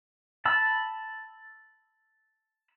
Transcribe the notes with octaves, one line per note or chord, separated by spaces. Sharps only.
A5 B5 E6